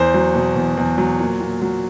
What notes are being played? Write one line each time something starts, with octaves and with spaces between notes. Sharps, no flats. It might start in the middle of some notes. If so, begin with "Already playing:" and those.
Already playing: E2 C5
F#3
B2
E2
E2
F#3
A#2
A#2
F#3